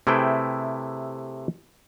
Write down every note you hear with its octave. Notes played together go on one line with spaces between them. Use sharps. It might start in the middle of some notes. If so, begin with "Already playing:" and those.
C3 A3 E4 G#4 B4 G5